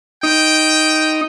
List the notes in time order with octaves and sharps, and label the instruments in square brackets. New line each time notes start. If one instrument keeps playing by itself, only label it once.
[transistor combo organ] D#4 [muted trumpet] G5